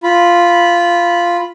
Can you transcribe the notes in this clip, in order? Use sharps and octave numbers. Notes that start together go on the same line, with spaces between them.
F4 B5